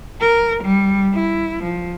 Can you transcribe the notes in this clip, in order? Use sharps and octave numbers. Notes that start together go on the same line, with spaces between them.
A#4
G3
E4
F3